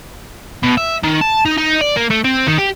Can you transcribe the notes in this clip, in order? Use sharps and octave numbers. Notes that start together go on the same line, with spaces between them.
B2
E5
D#3
A5
D#4
D#4
D5
A#3
A3
C4
D#3
G4